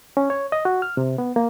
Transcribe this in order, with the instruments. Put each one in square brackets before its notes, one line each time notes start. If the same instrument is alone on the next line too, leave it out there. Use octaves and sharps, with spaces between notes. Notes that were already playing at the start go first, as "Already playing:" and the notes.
[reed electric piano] C#4
C#5
D#5
F#4
F6
C3
B3
A#3